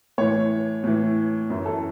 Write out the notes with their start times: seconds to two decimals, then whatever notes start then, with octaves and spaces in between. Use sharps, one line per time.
0.18 A2 E3 C#5
0.84 A2 E3
1.50 F#2 E3
1.65 A4